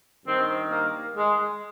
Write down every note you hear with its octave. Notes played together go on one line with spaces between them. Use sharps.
G2 D#3 C4
A#3
G#3